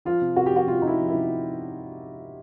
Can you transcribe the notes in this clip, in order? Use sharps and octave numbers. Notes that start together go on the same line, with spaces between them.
F3 F4
C3
C3 F#4
G4
F3 F#4
C3 F4
C3 D#4
E4
F3
E4
C3